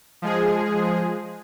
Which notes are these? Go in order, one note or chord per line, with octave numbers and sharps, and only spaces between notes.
F3 G#3 G#4